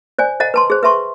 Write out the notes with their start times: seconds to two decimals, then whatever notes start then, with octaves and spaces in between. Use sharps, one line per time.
0.19 C5 D5 G#5
0.40 C5 D#5 F#5 A#5
0.54 B4 A5 C6
0.70 G#4 C5
0.83 B4 E5 A5 C6 C#6